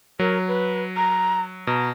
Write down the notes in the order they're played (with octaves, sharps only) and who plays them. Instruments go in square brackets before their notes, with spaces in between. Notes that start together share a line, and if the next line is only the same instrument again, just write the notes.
[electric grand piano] F#3 [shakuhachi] A#4
[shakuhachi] B4
A#5
[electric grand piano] B2 [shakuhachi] A#5